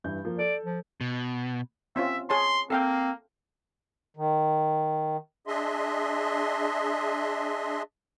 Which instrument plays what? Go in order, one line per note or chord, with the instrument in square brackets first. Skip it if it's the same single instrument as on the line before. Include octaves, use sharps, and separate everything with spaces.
[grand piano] G2 E3 G6
F3 A#3
[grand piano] A4 [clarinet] D5
[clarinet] F3
[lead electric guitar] B2
[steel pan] C4 C#4 F4 [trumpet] E5
[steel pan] G#4 C#5 A5 [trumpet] C6
[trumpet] A#3 [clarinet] C4 [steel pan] A4 F5 G5
[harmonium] D#3
[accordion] D4 G#4 D#5 E5 C6